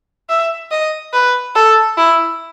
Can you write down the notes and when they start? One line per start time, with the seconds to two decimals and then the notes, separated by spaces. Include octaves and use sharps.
0.29 E5
0.72 D#5
1.14 B4
1.55 A4
1.97 E4